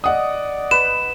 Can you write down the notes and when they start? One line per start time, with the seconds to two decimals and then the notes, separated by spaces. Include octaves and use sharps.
0.04 D5 D#5 F#5 D#6
0.71 B4 E7